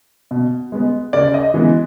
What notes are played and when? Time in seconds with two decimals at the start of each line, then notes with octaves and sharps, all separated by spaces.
0.31 B2
0.72 G#3 B3
1.13 C#3 D5
1.34 D#5
1.54 E3 G#3 B3